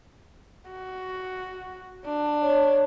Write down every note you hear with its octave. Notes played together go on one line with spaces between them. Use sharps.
F#4
D4
C#5